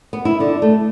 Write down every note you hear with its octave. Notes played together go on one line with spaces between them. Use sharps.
B3
E4
D3
A3